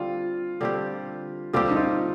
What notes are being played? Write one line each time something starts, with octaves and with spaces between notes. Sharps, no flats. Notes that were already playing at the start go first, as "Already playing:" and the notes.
Already playing: D3 G3 C4 F4 G4
D3 G3 C4 G4
D3 G3 C4 F4 G4
D#4
F4